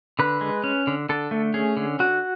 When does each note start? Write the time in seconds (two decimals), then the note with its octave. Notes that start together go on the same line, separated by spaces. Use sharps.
0.19 D3 B4
0.41 G#3
0.64 C#4
0.87 D3
1.09 D3 A4
1.31 A3
1.54 C#4 G#4
1.77 D3
1.99 D3 F#4